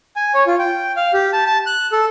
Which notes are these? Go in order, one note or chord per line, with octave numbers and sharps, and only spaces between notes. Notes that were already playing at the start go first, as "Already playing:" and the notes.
G#5
C#5
F4
G5
F5
G4
A5
A5
F#6
A4